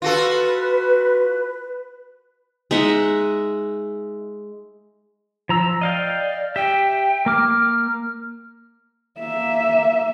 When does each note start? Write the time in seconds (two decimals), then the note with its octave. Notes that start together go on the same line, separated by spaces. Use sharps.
0.02 F4 F#4 A4 B4
2.71 G#3 D#4 E5 F#5
5.49 F3 A#5 E6
5.81 D5 D#5 F5 G5
6.56 G4 E5 G5
7.26 A#3 D6 F6
9.19 A#3 E5